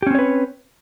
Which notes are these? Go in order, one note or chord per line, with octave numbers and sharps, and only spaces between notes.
C4 C#4 G4 B4 C#5